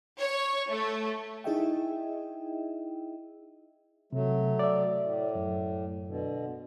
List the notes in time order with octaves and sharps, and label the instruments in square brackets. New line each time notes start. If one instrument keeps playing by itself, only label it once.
[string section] C#5
A3
[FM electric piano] D#4 E4 G#4 D#5 E5 G5
[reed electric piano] C3 [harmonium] F#3 A3
[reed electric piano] D5 E5
[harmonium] A2
[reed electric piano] F#2
[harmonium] B2 D3